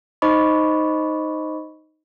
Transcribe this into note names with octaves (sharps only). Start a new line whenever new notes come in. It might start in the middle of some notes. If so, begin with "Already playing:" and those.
D#4 C5 D#5 B5 C#6 D6